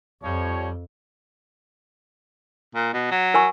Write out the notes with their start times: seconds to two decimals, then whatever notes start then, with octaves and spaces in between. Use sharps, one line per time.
0.23 F2 F3 G3 C#5
2.75 A#2
2.94 B2
3.11 F#3
3.34 A#4 G#5 C#6